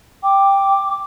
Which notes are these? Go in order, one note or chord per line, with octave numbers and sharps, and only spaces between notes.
G5 D6